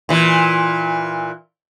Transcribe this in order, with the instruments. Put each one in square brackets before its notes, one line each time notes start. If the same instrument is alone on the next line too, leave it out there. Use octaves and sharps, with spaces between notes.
[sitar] A#2 E3